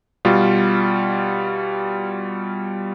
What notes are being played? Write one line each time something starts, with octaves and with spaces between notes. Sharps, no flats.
B2 G3 F4